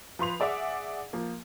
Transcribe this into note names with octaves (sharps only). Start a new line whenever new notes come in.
F3 B4 C6 F7
G#4 D5 E5 F#5 D6
F3 A#3